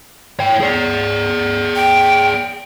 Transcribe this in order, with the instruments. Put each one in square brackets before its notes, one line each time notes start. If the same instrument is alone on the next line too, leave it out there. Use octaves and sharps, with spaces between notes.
[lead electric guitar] C#5 G5
G#4 D5
[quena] G5